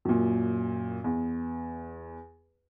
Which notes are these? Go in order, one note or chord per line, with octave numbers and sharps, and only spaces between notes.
F#2 A#2
E2